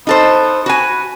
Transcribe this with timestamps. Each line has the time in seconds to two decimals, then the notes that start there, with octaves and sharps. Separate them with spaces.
0.07 B3 D#4 A4 C5
0.66 F#4 B4 G#5